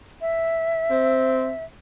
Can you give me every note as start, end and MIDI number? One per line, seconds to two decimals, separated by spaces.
0.21 1.64 76
0.90 1.52 60